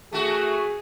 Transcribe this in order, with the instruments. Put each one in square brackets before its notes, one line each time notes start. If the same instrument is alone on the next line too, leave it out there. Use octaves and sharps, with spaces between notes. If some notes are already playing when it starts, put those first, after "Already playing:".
[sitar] A3 F#4 [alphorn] G#4